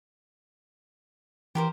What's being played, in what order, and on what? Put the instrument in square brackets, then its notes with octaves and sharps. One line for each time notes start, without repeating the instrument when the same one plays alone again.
[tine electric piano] E3 [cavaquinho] G4 A#4 C5